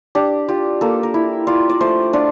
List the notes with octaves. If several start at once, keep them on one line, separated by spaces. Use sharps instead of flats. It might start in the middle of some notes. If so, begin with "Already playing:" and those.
D4 G4
F4 G4
A#3 A4
A#4
E4
F4 D5
D5
A3 C5
D4 F4